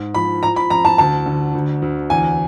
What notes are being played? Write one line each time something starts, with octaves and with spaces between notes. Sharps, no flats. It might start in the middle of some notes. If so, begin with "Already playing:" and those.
Already playing: G#2
F3 B5
F3 A#5
B5
F2 A#5
A5
D2 A5
D3
D2
D2
E2 G#5